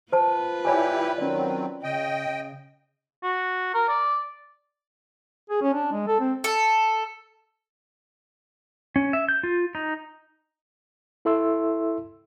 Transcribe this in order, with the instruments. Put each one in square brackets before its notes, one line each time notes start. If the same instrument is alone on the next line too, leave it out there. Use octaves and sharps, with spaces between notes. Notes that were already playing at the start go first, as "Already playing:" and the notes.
[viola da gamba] F4 B4 [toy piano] C5 A5
[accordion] E4 G4 [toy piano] C#5 D5 G#5
[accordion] D#3 F#3 C4 [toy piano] C#4 D5
[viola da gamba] C#3 [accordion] D#5 G5
[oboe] F#4
A#4
D5
[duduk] G#4
C#4
D4
G#3
A4
C4
[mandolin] A4
[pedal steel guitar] C#4
E5
G6
F4
D#4
[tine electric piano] E4 A4 E5 C6 E6